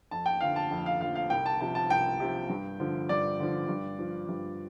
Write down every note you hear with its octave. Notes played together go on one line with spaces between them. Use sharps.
F2 A5
G5
D3 F3 F5
A5
F2
F5
D3 F3 F5
F5
C2 G5
A5
C3 F3 A5
A5
C2 G5
C3 F3
G2
D3 F3
G2 D5
D3 F3
G2
F3
G2